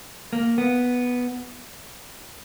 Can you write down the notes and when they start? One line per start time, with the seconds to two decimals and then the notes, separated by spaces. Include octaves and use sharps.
0.33 A#3
0.58 B3